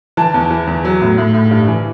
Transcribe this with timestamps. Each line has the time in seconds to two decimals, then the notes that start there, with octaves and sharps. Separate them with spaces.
0.17 E3 A5
0.34 E2
0.51 E3
0.67 E2
0.85 F#3
1.02 A2
1.18 A2
1.34 A2
1.51 G2
1.68 E3